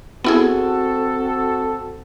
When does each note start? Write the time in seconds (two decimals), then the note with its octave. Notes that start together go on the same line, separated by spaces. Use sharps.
0.24 B3 C4 E4 F#4 G#4 A4